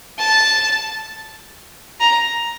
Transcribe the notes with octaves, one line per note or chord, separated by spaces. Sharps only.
A5
A#5